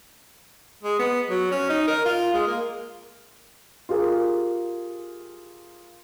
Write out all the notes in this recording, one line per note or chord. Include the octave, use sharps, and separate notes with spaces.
G#3
B3
F#3
C#4
D#4
A#4
F4
G#3
A#3
F4 G4 G#4 A#4